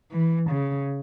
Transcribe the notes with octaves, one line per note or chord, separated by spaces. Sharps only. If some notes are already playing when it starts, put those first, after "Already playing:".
E3
C#3